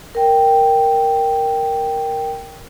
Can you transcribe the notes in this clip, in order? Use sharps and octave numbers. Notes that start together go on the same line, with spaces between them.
A#4 G5